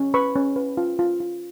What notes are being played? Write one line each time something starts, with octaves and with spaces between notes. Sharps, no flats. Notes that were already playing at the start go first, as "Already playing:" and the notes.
Already playing: C#4
B4 B5 C#6
C#4
B4
F4
F4
F4